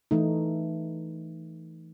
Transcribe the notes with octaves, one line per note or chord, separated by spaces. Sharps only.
E3 A3 D#4